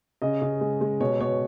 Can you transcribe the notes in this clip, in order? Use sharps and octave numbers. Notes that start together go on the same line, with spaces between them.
C#3 D#5
C#3
G#3
G#3
B2 C#5
B2 C#5